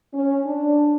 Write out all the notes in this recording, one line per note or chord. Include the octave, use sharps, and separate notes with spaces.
C#4
D4